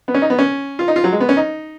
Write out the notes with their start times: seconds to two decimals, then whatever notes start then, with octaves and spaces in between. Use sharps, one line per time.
0.08 B3
0.14 C#4
0.22 D#4
0.30 B3
0.38 C#4
0.79 F4
0.88 D#4
0.96 F4
1.04 F#3
1.12 G#3
1.20 B3
1.29 C#4
1.37 D#4